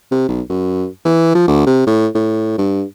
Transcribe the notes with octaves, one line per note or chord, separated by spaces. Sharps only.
C3
B1
F#2
E3
F3
D2
C3
A2
A2
G2